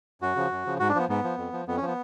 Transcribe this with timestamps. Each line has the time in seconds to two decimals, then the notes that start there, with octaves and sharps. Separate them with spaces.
0.21 F#2 F#4
0.36 C#3 F3
0.52 F#2
0.66 C#3 F3
0.80 G#2 F#4
0.89 D4
0.95 F3 B3
1.09 G#2 B3
1.24 F3
1.38 F2
1.53 F3
1.68 F2 B3
1.77 C#4
1.82 F3
1.87 B3